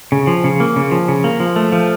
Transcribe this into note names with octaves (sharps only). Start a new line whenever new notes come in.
C#3
F3
C#3
A#3
C#3
F3
C#3
A#3
F3
A3
F3